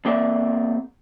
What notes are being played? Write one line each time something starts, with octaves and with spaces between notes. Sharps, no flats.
E2 A#3 C4 D5 E5